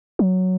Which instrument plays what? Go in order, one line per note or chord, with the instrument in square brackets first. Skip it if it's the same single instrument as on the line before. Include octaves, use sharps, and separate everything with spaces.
[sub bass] F#3